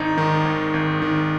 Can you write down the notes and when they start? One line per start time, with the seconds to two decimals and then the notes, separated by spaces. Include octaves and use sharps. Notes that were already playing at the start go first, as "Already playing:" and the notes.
Already playing: G#1 D#4
0.18 D#3
0.45 G#1
0.74 G#1
1.02 D#3